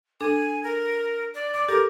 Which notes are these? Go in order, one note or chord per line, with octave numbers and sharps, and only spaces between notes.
D4 A4 G#5
A#4
D5
D5 D6
G4 A4 A#4 D6